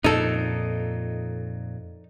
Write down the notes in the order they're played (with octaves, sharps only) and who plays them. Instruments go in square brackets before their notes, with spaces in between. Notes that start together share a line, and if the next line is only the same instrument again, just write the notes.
[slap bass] F2 A#2 [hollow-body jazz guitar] D#4 A4